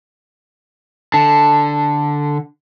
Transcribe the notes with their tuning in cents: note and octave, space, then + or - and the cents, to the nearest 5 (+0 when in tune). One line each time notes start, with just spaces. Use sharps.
D3 +0 A5 +0